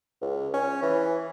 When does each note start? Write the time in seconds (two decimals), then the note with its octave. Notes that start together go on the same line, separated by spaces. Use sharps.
0.22 C#2
0.54 C#4
0.82 E3